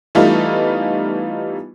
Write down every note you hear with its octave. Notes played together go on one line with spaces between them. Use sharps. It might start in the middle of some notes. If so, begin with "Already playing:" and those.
E3 G3 A3 B3 D#4 F4